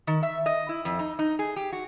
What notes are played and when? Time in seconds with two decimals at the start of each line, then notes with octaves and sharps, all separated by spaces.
0.07 D#3
0.23 E5
0.46 D#5
0.69 E4
0.85 F2
0.99 D#4
1.19 D#4
1.39 G#4
1.56 G4
1.72 F#4